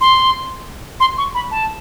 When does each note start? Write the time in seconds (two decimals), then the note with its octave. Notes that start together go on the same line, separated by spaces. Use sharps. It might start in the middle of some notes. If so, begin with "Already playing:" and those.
0.01 C6
1.00 C6
1.18 C#6
1.35 B5
1.51 A5